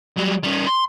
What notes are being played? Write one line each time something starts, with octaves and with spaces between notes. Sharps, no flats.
F#3 G3
G3 C#4
C6